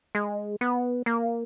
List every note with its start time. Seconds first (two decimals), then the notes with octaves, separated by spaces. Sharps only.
0.15 G#3
0.61 B3
1.06 A#3